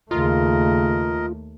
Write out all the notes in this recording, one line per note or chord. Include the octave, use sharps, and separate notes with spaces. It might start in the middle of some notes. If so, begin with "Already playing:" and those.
D#2 C#3 A3 F4 A#4 D#5